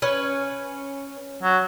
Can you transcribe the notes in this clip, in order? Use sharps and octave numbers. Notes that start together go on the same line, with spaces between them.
C#4 B4
F#3